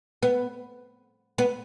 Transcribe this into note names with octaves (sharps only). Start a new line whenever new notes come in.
B3
B3